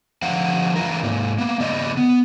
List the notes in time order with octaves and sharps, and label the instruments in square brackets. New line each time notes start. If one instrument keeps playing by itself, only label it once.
[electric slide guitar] D3 F3 F5 F#5
E3 F4 A#4
G#2 A#3
A#3 B3
C#3 A#3 D5 D#5
B3